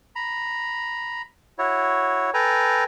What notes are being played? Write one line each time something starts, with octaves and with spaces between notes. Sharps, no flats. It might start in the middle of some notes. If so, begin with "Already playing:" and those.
A#5 B5
E4 F#4 C#5
A4 B4 G5 G#5 A#5